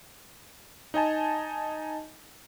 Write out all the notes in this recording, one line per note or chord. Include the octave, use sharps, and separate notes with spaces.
D#4 D#5 G#5 A5